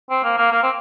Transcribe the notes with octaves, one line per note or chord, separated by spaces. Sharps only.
C4
A#3
A#3
A#3
C4